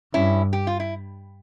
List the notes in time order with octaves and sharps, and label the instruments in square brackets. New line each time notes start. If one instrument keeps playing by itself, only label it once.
[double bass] G2 [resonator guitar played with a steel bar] C#4 E4
[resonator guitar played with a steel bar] G4
F4
E4